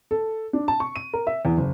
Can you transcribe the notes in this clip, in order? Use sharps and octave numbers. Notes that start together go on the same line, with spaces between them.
A4
D4
A5
C#6
D#7
A#4
E5
E2
F#1